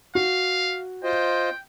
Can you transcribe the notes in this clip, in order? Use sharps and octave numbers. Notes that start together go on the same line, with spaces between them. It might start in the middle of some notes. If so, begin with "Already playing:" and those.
F#4 F5
F4 C5 D#5 G5